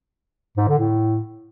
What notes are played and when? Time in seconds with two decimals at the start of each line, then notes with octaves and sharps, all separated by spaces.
0.57 G#2
0.68 D3
0.79 A2